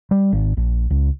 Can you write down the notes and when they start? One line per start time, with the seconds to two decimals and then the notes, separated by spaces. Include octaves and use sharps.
0.11 G3
0.33 G#1
0.57 A#1
0.90 C#2